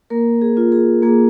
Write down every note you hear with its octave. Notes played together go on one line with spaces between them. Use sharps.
A#3 A#4
G#4
F4
G#4
A#3 G#4